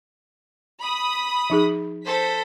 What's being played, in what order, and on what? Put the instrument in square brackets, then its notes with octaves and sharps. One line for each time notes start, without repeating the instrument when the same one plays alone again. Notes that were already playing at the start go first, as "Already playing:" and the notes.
[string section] B5 D#6
[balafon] F3 D#4 G#4
[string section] A4 C5 B6